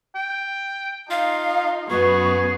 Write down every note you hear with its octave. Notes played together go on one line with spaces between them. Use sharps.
G5
D#4 F4 F5
F#2 B3 F#4 G#4 C#6